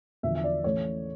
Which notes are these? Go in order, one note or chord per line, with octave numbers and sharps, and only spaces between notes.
E2 D3 F3 E5
E5
D5
A1 A2 E3 A3 C#5